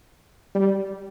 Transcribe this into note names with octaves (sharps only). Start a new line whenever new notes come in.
G3